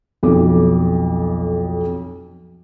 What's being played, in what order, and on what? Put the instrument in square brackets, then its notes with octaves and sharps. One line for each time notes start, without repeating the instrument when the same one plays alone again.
[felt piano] B1 F2 D6